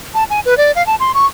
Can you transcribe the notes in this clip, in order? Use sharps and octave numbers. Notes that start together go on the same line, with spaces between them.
A5
G#5
B4
D5
F5
A5
C6
C#6